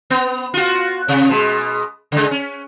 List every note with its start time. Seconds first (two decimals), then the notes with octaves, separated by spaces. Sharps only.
0.10 B3
0.54 F4 F#4
1.08 C3
1.29 B2 G#3
2.12 C#3 G#3
2.31 C#4